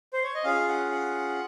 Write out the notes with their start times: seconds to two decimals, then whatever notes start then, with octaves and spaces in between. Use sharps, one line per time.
0.13 C5
0.24 C#5
0.35 D#5
0.44 C#4 F4 G#4 F5
0.68 F#5
0.92 F#5